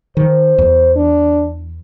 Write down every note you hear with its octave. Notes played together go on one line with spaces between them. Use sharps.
D#3 C5
E2
D4